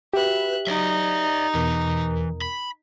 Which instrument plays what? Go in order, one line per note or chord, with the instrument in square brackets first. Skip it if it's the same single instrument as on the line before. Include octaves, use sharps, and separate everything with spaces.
[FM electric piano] F#4 B4 [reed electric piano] G4 [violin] E5 F#6
[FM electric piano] F#3 [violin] D#4 [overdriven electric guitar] D5 E5
[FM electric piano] E2 B2 A#4 [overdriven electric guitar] E3
[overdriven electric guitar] B5